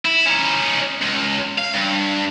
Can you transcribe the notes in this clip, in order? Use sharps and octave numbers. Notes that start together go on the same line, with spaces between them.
E4
C#4 D#4
C#2
F5
G2